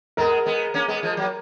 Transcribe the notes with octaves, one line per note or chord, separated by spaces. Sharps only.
G#3 B3 A#4
G#3 B3
A#3 C#4
G#3 B3
F3 G#3
F#3 A#3